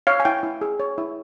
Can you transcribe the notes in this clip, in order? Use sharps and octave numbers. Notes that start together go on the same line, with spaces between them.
C#5 F5
G#5
E4 G5
E4
G#4
C#5
E4